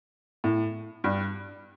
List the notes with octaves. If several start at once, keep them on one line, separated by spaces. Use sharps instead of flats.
A2
G2